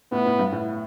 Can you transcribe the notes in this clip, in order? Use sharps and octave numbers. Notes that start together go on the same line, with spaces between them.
A2 B3
A2
G2
A2